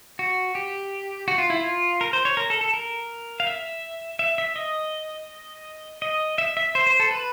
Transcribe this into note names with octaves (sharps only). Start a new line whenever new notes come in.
F#4
G4
F#4
F4
E4
F4
A#4
C5
C#5
A#4
A4
A4
A#4
F5
E5
E5
E5
D#5
D#5
E5
E5
C5
C5
A4
B4